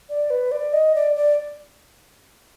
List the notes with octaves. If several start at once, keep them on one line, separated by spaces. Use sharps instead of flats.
D5
B4
D5
D#5
D5
D5